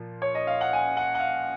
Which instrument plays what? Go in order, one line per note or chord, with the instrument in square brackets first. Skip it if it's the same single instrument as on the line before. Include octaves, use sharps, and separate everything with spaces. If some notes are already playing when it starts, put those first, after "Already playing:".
Already playing: [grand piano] A#2 F3 A#3
C#5
D#5
F5
F#5
G#5
F#5
F#5
F5